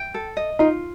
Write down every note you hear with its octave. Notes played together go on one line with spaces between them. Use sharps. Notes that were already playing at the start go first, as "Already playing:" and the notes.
Already playing: G5
A4
D#5
D#4 F4